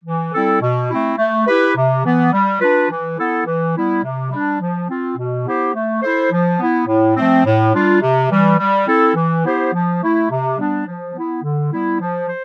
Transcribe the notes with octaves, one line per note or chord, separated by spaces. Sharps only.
E3
G3 C4 E4 A4
B2
A3 C4 E4
A3
E4 G4 B4
C3
E3 B3
G3
D4 F4 B4
E3
B3 E4 A4
E3
G3 B3 E4
C3
G3 D4
F3
C4 F4
B2
B3 E4 G4 C5
A3
E4 A4 C5
F3
B3 E4
A2
F3 A3 C4
A2
G3 D4 F4
C3
E3 G3
G3
C4 E4 A4
E3
B3 E4 G4 C5
F3
A3 E4
C3
G3 B3 D4
F3
B3 E4
D3
G3 B3 E4
F3
C5